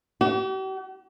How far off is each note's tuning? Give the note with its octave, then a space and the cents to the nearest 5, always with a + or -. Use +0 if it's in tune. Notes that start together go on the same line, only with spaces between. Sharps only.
G4 -45